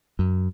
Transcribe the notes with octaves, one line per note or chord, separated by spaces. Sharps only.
F#2